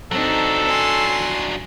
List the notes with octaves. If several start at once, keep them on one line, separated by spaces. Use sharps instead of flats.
F#3 C4 D4 D#4 A4
G#5 C6